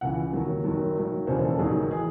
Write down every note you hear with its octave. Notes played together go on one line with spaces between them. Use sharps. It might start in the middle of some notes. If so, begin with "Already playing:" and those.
C#2 C#3 E3 F#5
D#2 D#3 F#3
F#1 F#2 D#3 F#3
G#1 F#2 D#3 F#3
E1 D#2 C#3 E3 C5
A4
A1 G#2 D#3 F#3 G#4
E3 G#4